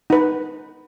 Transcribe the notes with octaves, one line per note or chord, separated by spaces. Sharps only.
D#4 B4